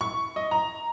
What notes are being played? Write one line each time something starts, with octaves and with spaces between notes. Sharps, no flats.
C#6
D#5
A#5